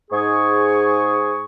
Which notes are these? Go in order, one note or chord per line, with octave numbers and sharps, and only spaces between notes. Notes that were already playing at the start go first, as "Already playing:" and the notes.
G#2 G#4 C#6